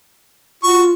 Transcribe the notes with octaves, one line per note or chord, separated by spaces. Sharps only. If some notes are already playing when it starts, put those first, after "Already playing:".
F4 F#4 C#6